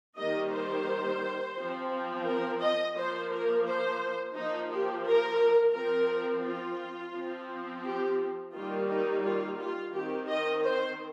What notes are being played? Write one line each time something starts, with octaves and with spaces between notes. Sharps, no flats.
D#3 G3 A#3 D#5
C5
F3 C4
A#4
D#5
F3 A#3 C5
A#4
C5
F3 A#3 D#4
G4
A#4
F3 C4 A#4
F4
F3 C4
G4
D#3 G3 A#3 F4
D#4
F4
F4
D#3 C4 G4
D#5
C5